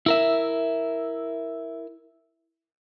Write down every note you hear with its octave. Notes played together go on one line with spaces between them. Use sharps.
E4 A#4 E5